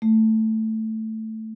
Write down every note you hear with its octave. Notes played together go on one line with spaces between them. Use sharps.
A3